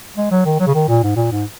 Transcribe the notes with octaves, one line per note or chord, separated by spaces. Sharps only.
G#3
F#3
D#3
F#3
C#3
D#3
A#2
G#2
A#2
G#2